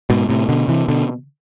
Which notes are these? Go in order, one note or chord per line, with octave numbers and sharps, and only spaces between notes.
G#2 B2
A2 C3
B2 D3
C3 E3
B2 D3